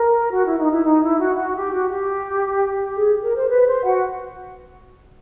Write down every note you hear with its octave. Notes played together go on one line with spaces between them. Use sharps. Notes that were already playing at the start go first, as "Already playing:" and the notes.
Already playing: A#4
F#4
E4
D#4
E4
D#4
E4
F#4
F#4
G4
F#4
G4
G#4
A#4
C5
B4
C5
F#4 F#5